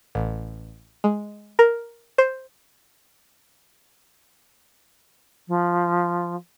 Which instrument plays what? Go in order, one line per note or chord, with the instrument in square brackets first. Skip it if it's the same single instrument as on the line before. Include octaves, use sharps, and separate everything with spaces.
[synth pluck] A1
G#3
A#4
C5
[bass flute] F3